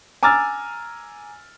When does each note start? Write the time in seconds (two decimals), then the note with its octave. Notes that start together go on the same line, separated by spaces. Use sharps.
0.23 G#5 A#5 D6 E6 F6 A6